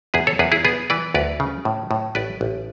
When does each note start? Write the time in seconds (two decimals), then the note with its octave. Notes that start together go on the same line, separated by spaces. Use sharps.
0.14 E2 G#4 B4
0.27 A4 C#5
0.39 E2 G#4 B4
0.52 E4 G#4
0.65 B3 G#4 B4
0.90 E3 B4 D5
1.14 D2 B4 D5
1.40 C#3
1.65 A2
1.91 A2
2.15 A1 B4 D5
2.41 A1